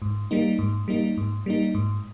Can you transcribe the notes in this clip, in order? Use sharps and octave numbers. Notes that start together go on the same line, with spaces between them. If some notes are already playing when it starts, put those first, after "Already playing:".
G#2
G3 A#3 D#4
G#2
G3 A#3 D#4
G#2
G3 A#3 D#4
G#2